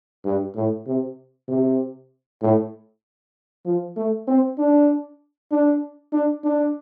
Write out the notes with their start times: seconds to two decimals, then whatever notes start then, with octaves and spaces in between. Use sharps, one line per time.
0.25 G2
0.56 A2
0.87 C3
1.49 C3
2.42 A2
3.65 F3
3.97 A3
4.27 C4
4.58 D4
5.52 D4
6.13 D4
6.44 D4